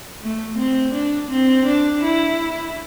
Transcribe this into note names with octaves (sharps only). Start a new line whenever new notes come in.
A3
C4
D4
C4
D4
E4